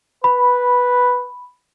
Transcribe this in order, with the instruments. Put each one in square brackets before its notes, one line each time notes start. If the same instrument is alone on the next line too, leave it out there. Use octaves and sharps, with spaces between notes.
[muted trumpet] B4 [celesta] B5